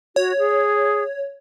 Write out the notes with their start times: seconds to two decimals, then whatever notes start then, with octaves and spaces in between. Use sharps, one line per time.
0.16 F#4 C#5
0.39 G#4